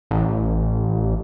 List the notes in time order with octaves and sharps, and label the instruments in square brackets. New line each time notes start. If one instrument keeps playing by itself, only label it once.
[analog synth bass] A1